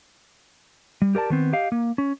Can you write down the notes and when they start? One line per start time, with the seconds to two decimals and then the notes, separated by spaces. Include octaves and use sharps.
1.02 G3
1.15 G4 A#4 D5 A5
1.30 D#3 B3 C4
1.53 G4 D#5 F5
1.72 A#3
1.98 C#4